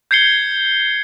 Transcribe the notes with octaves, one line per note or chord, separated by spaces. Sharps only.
G6 G#6 C7 C#7 G7